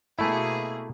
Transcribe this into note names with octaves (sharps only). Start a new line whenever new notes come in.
B2 A3 A#3 E4 G#4